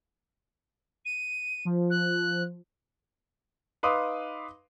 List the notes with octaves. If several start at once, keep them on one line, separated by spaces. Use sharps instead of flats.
D#7
F3
F#6
D#4 B4 F5 C6 D6 D#6